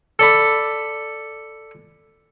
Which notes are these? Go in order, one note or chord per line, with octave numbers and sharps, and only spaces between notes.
A4 D5 B5